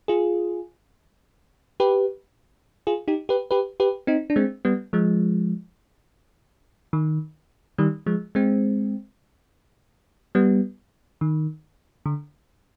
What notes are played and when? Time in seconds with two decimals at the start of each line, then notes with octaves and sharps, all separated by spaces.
0.08 F4 G#4
1.80 G4 B4
2.87 F4 G#4
3.08 D#4 G4
3.29 G4 B4
3.51 G4 B4
3.80 G4 B4
4.07 C4 D#4
4.30 D4
4.36 G#3 C4
4.65 G3 B3
4.93 F3 G#3
6.93 D#3
7.78 D#3 G3
8.06 F3 G#3
8.35 G#3 C4
10.35 G3 B3
11.21 D#3
12.06 D3